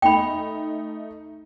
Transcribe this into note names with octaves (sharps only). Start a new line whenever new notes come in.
A3 D#4 G5 B5